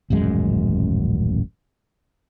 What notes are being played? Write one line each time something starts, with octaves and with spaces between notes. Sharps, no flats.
D#1 A1 F#2 G#3